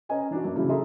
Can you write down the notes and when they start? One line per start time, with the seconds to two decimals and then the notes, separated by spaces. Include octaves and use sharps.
0.09 C#4 B4 D#5 G#5 A#5
0.31 E3 D4 D#4 F#4
0.44 F#2 F#3 A#3 C#4 D4
0.56 C#3 E3 F#3 E4
0.69 G#4 A4 E5 A#5 C6